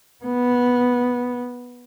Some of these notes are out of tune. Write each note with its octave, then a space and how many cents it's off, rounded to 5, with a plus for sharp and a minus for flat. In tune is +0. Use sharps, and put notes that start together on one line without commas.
B3 -10